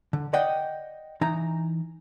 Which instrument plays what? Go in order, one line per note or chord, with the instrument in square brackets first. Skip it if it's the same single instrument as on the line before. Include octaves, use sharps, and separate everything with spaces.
[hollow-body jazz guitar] D3
D5 D#5 F#5 G5
E3 D#4 A#5